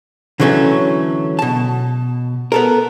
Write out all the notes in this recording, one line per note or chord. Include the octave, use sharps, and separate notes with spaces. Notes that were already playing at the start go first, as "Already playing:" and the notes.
D3 E3 F#3 A3 C4 C#4
B2 A5
B3 A4 A#4